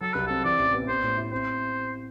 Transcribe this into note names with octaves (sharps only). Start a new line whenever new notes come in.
F#3 A4
C2 B4
C4 A4
E3 D5
A1
B3
B3 C5
A2
E4
C4 C5